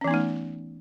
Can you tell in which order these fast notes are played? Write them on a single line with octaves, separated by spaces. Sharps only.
C#4 E3 B3 D#4 A3